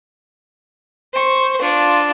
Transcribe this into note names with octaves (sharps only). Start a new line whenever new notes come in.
C5 C#6
D4 F4